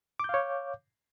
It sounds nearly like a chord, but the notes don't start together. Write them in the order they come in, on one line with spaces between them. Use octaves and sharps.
D6 G6 F5 C#5